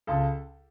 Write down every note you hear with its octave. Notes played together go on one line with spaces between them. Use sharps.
C#2 A4